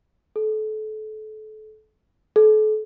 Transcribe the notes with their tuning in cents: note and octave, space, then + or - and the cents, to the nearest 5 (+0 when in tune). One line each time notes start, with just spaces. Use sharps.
A4 -30
A4 -40